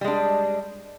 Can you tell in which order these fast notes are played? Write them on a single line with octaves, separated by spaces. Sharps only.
G3 G#3 D4